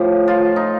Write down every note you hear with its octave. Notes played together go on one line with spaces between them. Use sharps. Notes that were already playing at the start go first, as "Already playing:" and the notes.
Already playing: A2 F3 G4
F4
D#4